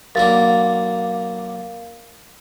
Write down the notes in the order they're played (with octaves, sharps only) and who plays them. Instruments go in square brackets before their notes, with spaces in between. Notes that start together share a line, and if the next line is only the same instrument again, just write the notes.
[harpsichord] B1 D3 A#3 [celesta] A#4 F5 A6